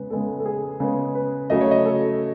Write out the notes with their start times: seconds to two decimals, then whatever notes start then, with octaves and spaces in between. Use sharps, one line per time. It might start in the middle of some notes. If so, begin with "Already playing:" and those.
Already playing: C#3 G#3 B3 B4
0.10 C#3 G#3 B3 A4
0.40 A4
0.45 G#4
0.80 C#3 G#3 B3
1.15 B4
1.50 C#3 F#3 A3 D#5
1.61 C#5
1.71 D#5
1.85 A4